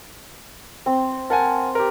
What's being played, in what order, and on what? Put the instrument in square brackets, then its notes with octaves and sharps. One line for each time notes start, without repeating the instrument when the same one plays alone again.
[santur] C4
[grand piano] A#4 F#5 G#5 [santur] A5
[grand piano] G4 A#4